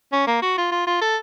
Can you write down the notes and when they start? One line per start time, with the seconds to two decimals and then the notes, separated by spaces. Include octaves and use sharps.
0.12 C#4
0.27 A#3
0.42 F#4
0.58 F4
0.71 F4
0.87 F4
1.01 A4